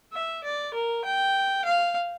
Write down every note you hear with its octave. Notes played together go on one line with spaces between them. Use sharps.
E5
D5
A#4
G5
F5